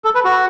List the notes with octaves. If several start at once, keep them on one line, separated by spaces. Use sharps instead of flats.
A4
B4
F#4